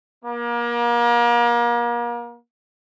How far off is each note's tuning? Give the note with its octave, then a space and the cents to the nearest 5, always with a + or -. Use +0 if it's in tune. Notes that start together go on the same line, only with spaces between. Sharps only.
A#3 +35